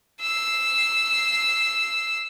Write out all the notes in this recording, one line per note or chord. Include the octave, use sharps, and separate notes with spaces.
E6 C7